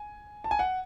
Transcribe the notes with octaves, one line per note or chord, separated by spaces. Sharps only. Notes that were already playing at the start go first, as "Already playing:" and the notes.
Already playing: G#5
A5
G#5
F#5